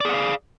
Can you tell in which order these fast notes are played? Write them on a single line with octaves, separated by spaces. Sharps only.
D5 G#4 F#5 F5